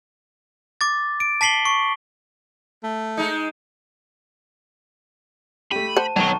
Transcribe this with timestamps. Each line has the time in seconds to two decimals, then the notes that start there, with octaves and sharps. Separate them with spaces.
0.81 D6 A6
1.20 D7
1.41 A5 B6 C7 F#7 G7
1.65 C#6
2.83 A3
3.17 G#3 D#4
5.72 A3 G4 B5 D#7
5.97 C5 F#5 A5
6.16 B1 D#3 C#5 A5 A#5 C#6